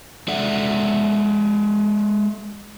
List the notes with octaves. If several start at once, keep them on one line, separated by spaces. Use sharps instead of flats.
G#3 A4 D5 E5 F#5